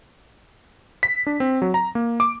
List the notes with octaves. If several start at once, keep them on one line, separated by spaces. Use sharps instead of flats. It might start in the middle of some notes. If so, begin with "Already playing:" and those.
B6
D4
C4
F#3
A#5
A#3
D6